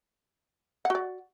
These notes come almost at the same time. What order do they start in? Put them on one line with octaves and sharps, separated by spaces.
F#5 F#4 D5